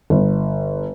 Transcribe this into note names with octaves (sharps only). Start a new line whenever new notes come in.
G1